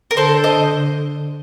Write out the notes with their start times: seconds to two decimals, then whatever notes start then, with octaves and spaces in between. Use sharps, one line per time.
0.11 A#4
0.17 D3 A4 C5
0.44 C5 D#5